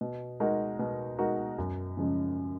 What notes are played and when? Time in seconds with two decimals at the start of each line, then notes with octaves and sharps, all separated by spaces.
0.01 B2
0.40 G#3 D#4 F#4 A#4
0.79 B2
1.19 G#3 D#4 F#4 A#4
1.58 F#2
1.97 C#3 F3 G#3 C#4